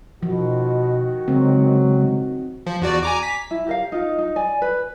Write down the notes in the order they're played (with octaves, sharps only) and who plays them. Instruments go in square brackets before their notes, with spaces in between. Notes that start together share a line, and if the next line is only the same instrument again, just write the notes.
[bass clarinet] B2 [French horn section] D#3 F#4 [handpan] F3
[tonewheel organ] C#3 G#3 [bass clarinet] F#3 [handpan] C4
[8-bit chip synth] F3
E2 F#4 D5
G#5 A#5 D6
B6
[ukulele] E4
G4 A#4 F5
D#4 F4
D#4
D5 G#5
B4